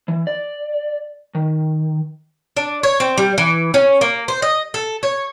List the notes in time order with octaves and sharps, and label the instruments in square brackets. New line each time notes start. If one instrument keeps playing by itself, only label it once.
[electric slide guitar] E3
D5
D#3
[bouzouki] D4
C#5
C4
G3
E3
C#4
A#3
C5
D#5
A4
C#5